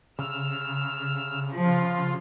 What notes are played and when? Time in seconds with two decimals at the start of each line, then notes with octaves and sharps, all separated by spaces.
0.19 C#3 E6 F6
1.53 F3 F4